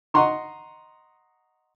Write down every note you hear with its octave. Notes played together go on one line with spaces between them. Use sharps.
D#5 F#5 A#5 C6 C#6